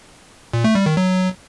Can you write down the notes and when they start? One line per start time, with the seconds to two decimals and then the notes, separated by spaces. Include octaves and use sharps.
0.53 A#2
0.64 A3
0.75 G3
0.86 D#3
0.97 F#3